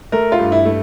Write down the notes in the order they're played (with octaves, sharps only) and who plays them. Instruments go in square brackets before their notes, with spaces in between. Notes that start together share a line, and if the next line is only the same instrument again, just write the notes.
[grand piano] A3 A#4
F4
G2
E4
A3